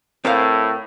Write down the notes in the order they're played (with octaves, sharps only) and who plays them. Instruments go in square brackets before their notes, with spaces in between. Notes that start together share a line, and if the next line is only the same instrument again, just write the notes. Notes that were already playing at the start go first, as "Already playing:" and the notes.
[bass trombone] A2 [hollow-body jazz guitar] C4 A#4 F5